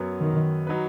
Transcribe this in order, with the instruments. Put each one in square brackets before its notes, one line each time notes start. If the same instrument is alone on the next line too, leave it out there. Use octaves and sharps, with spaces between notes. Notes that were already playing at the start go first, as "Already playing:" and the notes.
Already playing: [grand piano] F#2 F#3 B3
[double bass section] D#3
[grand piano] F#3 D#4 B4